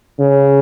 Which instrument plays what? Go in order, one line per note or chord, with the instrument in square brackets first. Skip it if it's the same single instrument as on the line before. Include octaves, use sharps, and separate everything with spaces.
[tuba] C#3